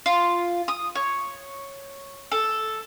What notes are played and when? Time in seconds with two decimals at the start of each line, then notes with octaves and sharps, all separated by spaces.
0.06 F4
0.68 D#6
0.95 C#5
2.32 A4